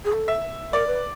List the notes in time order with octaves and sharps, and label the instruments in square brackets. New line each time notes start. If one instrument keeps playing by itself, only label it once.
[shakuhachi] G#4
A4
[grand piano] E5
[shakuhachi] A#4 [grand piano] D5
[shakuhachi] B4